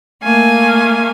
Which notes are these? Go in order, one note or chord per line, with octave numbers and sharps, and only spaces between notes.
A3 A#3 F5 G#5